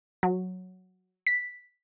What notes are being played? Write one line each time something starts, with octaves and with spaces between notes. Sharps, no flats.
F#3
B6